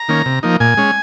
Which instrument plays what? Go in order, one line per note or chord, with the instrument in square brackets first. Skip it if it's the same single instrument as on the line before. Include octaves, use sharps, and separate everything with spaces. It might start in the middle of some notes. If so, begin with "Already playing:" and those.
Already playing: [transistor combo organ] A#5
D#3 A#3 C#4
C3
F3 A#3 D#4
A#2 G#5
G#3 C#4